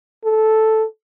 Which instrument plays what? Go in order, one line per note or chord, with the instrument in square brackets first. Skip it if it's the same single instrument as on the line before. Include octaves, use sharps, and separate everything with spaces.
[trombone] A4